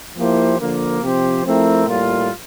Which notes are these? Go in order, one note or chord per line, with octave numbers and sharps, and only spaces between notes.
F3 A#3 E4 G4 C5
D3 F3 A#3
C3 F3 C4 G4 C5
F3 A3 C4 E4 A#4
A2 G3 A#3 F4